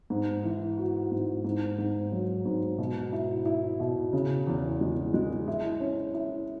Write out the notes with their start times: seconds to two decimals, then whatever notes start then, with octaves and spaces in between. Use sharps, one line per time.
0.10 G#2
0.44 E3
0.78 F#4
1.12 G#2
1.44 G#2
1.78 G#2
2.12 F#3
2.45 G#2
2.78 B2
3.13 E4
3.46 E4
3.80 B2
4.13 C#3
4.47 E2
4.81 G#3
5.14 G#3
5.48 E4
5.80 C#4
6.14 E4